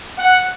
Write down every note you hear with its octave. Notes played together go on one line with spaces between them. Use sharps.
F#5